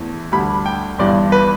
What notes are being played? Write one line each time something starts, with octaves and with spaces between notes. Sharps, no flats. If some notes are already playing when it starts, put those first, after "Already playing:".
Already playing: E2 E3 A3
D2 D3 G3 B5
G5
G1 G2 E3 D5
B4